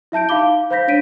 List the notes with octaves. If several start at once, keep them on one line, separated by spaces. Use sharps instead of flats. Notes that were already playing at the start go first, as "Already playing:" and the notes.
E4 E5 A5 G6 D7
D#4 F5 B5 D6 G7
C5 F5 B5 G6 A#6 B6
D4 C#5 B6 D7 D#7